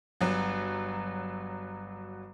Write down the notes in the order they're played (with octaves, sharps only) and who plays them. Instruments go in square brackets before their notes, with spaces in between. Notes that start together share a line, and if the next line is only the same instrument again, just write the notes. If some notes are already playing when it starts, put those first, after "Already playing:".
[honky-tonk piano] G1 F#3